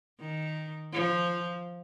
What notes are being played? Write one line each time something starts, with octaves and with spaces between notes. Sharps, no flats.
D#3
F3